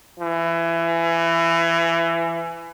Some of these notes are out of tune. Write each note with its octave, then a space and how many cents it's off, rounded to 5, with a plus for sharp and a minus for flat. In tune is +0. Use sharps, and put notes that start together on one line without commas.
E3 +25